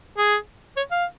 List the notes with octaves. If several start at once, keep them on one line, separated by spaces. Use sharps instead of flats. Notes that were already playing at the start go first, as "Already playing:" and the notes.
G#4
C#5
F5